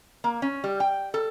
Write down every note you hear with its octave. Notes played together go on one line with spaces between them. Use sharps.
A#3
C#4
G3
G5
A4